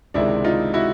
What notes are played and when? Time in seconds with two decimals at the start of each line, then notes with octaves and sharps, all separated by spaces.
0.14 C#2 C3 D#3 G#3 D4 E4
0.44 D#4 F4
0.74 E4 F#4